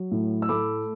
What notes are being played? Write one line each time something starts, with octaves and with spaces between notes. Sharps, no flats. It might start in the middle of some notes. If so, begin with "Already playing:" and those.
Already playing: F#3
A2
E6
A3 B5 D6